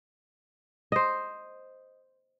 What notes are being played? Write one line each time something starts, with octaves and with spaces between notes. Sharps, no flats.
C5 D#5